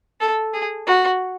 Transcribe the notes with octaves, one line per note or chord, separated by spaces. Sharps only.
A4
G#4
F#4